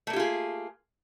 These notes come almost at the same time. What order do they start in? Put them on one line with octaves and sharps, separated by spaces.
A3 A#3 G4 F4 G#4